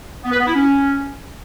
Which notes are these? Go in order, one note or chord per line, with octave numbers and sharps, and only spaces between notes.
B3
B4
B3
E4
C#4